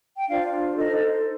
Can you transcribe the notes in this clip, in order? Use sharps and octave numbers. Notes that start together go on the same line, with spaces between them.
G5
D4 F4 C5 D5 F5
D#4 A4 C5 D#5